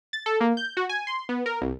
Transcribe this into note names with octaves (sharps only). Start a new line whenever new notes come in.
A6
A4
A#3
G6
F#4
G#5
C6
B3
A#4
C2